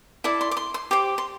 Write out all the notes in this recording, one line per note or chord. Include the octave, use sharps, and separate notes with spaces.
E4 A4 D5
C6
D6
C6
C6
G4 C5 D6
C6